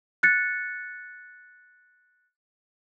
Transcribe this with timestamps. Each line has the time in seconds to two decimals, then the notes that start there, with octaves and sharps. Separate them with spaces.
0.23 F#6 A6 C#7